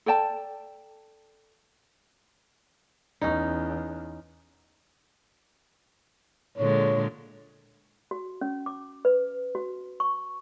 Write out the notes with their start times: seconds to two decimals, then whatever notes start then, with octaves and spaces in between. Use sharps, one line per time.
0.06 A4 D5 G5 A5
3.21 E2 C#4 D#4
6.58 A#2 D3 G#3 C#5
8.11 F#4
8.41 C#4
8.66 D6
9.05 B4
9.55 F#4
10.00 C#6